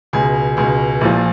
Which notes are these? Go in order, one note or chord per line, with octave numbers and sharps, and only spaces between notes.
C#2 B2 G#4
C#2 B2 G#4
A#1 A#2 F3